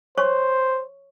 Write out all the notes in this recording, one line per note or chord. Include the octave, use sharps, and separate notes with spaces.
C5 C#5 C#6